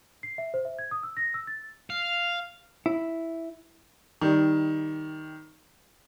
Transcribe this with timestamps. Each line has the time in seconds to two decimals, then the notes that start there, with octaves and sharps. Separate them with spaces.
0.23 C7
0.38 E5
0.54 C5
0.65 E5
0.79 G#6
0.91 D#6
1.03 E6
1.17 A#6
1.34 E6
1.47 A6
1.90 F5
2.86 E4
4.22 D#3 G3